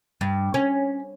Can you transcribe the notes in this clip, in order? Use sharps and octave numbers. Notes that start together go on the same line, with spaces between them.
G2
C#4